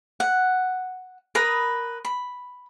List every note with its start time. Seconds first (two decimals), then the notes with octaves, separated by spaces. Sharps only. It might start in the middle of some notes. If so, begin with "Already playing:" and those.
0.20 F#5
1.35 A#4 B4 B5 D#6
2.05 B5